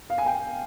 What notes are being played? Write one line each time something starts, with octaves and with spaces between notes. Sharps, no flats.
F5
G#5
G5